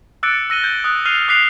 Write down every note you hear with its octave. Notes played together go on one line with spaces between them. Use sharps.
D6 E6 F#6 A6 C#7 D7
E6 A#6 D#7 G7
G6
D#6 F#6
F6 F#6 C7 D#7 F7
D6 F#6 B6 C7 F7